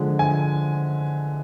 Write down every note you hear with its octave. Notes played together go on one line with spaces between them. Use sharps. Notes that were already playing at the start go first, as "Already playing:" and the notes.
Already playing: D3 F3 G#3
G#5